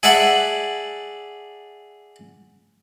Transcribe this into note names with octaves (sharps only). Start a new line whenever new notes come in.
G#4 D5 E5 F#5 A5 B5